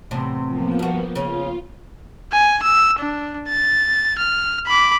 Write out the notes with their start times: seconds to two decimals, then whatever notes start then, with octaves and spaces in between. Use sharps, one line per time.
0.11 E2 A2 C3
0.46 F3 A#3 B3
0.79 G2 F#4
1.15 C#3 C#4 F4
2.32 G#5
2.63 E6
2.99 D4
3.49 A6
4.18 F6
4.67 B5 D6